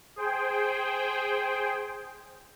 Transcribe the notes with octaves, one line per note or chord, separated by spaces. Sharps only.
G#4 C5 G5